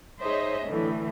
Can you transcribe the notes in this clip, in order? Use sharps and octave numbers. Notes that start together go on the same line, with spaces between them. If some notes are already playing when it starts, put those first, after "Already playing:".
D#4 G#4 C5 C#5 D#5 E5
A2 D3 E3